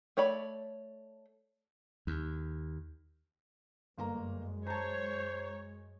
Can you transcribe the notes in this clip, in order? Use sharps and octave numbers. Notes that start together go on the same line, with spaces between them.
A3 C#5 D5 B5
D#2
G1 F#2 G#3 A#3 A#5
C5 C#5 A5 A#5